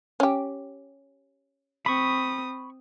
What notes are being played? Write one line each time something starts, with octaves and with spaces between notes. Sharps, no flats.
C#4 G4
C4 B5 C#6 D#6